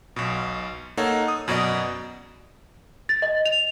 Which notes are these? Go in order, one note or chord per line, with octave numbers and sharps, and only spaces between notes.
B1 B2
A#3 D#4 A4 C#5 F#5
D#6
F#2 B2 B3 D5 D#5
A6
D#5
F7